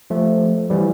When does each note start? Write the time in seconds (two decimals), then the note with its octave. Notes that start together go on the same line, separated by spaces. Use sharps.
0.10 F3 A3
0.70 E3 G3